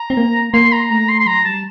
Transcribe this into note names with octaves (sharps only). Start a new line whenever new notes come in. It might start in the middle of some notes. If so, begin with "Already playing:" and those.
Already playing: A#5
C4
A#3
A#3 C6
A#5
A3 A#5
C6
C6
F#3 A#5
G3 A5